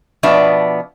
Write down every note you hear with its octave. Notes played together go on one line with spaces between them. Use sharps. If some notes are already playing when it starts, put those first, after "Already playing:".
B2 F3 B3 D4 D5 E5